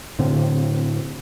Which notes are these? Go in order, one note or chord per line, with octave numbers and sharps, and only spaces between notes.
A2 D3 C4